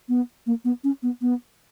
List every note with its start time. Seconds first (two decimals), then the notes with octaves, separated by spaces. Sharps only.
0.09 B3
0.46 A#3
0.65 B3
0.84 C#4
1.02 B3
1.22 B3